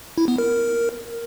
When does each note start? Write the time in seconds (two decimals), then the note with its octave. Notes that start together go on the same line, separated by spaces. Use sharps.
0.18 E4
0.28 B3
0.38 A#4